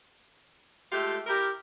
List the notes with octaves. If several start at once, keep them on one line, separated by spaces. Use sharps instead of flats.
G#3 A3 F4 G4 A4
E4 G4 A#4